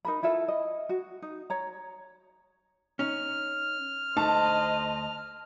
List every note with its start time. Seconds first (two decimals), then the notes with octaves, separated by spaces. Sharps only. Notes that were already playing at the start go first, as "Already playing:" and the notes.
0.05 D#4 A#4 B5
0.23 E4 F4 A4 E5
0.48 D#5
0.89 F#4
1.22 D#4
1.50 C#5 A#5
2.99 C#4 D#4 F6
4.17 D2 A3 D#4 C5 D#5 A5